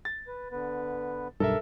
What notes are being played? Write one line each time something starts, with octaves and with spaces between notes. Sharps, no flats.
A6
B4
D3 B3 B4
B1 G2 A4 A#4 E5